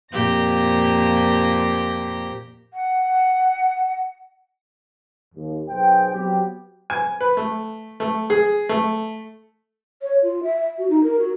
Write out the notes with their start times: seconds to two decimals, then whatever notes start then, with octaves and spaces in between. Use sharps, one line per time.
0.11 F2 A#2 G4 G6 A#6
2.74 F#5
5.35 D#2
5.69 B1 G#4 C5 G5
6.12 F#3 B3 C4 G4
6.90 G#5
7.21 B4
7.37 A3
8.00 A3
8.30 G#4
8.69 A3
10.02 C#5
10.23 F4
10.43 E5
10.78 F#4
10.90 D#4
11.04 A#4
11.19 F#4